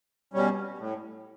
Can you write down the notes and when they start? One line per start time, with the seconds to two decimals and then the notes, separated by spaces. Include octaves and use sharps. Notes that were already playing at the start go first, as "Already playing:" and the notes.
0.34 B2 G3 C#4
0.78 A2